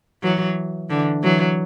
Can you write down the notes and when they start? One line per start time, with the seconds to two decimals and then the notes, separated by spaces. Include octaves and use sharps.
0.23 E3 F#3
0.89 D3 E3
1.23 E3 F#3